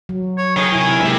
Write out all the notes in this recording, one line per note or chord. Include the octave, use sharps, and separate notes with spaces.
F#3
C#5
D#3 D#4 G#4 C#5
C3 E4 G#5
G#3 A#3 E4 G4 E5